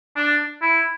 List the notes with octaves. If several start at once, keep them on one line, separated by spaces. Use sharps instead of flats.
D4
E4